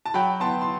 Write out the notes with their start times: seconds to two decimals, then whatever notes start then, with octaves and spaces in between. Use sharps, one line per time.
0.06 A5
0.14 F#3 G5 B5
0.40 B3 A5 C6
0.62 C6